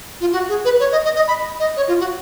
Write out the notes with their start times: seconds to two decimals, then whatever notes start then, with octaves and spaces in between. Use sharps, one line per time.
0.20 F4
0.32 F#4
0.49 G#4
0.65 B4
0.80 C#5
0.92 D#5
1.05 D#5
1.16 D#5
1.28 B5
1.59 D#5
1.76 C#5
1.88 F4
2.00 F#4